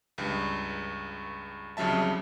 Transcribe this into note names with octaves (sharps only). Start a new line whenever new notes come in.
C#2 G2
C2 F2 C#3 F#3 E5 A5